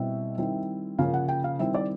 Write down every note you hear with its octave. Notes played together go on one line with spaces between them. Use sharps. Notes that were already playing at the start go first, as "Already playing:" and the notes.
Already playing: B2 G3 C4 E4 E5
D#3 G3 C4 E4
C#3 F3 A#3 C#4 F5
F#5
G5
F5
D#3 G3 C4 E4 E5
D5